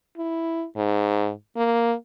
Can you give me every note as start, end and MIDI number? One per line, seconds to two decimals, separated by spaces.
0.17 0.65 64
0.76 1.31 44
1.57 1.94 58